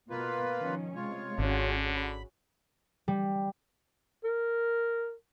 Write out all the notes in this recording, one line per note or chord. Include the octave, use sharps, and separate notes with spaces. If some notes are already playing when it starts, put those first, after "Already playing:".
B2 A#3 F4 B4
D#3 F3 C#4
C3 G#3 F4 C#5
G#1 D3 C#4 F#4 G#4
B5
G3
A#4